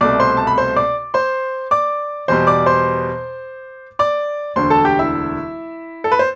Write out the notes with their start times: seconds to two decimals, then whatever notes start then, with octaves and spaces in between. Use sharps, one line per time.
0.01 C2 B2 A3 D5 D6
0.20 C5 C6
0.37 A5
0.47 B5
0.58 C5 C6
0.76 D5 D6
1.14 C5 C6
1.71 D5 D6
2.28 E2 B2 G3 C5 C6
2.47 D5 D6
2.66 C5 C6
3.99 D5 D6
4.56 E1 D2 D3 C5 C6
4.70 A4 A5
4.85 G4 G5
4.99 E4 E5
6.04 A4
6.12 B4
6.19 C5